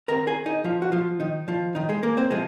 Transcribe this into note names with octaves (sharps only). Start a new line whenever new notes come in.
D#3 G#3 C4 A#4 A#5
G#4 G#5
D#4 D#5
F3 F4
F#4
F3 F4
D#3 D#4
F3 F4
D#3 D#4
G#3 G#4
A#3 A#4
C4 C5
C3 F3 G#3 G#4